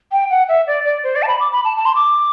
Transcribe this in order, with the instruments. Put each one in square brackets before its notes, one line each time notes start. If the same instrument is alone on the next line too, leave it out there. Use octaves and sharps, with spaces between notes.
[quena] G5
F#5
E5
D5
D5
C5
D5
A5
B5
D6
B5
A5
A5
C6
D6